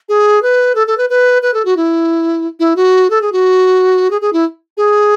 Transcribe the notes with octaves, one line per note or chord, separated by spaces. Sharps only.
G#4
B4
A4
A4
B4
B4
B4
A4
F#4
E4
E4
F#4
A4
G#4
F#4
G#4
G#4
E4
G#4